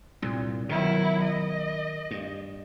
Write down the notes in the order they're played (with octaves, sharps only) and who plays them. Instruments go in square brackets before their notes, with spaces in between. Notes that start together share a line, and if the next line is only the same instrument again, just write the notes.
[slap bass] C2 G2 [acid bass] A#2
[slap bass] B2 [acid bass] D#3 [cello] F#3 E4
[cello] D#5
[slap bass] G2